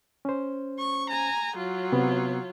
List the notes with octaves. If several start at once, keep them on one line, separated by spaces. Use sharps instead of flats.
C#4 C5
C#6
G#5 A#5
F#3 F4
C3 B3